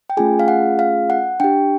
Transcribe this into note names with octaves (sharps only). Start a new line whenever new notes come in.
G5
A3 C#4 F4 G#4 G#5
F5
F#5
F5
F#5
D4 G4 G5